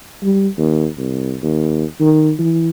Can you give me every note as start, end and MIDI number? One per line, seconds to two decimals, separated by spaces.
0.23 0.48 55
0.58 0.87 39
0.98 1.35 36
1.43 1.84 39
2.00 2.32 51
2.39 2.70 52